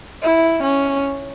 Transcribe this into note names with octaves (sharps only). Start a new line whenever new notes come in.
E4
C#4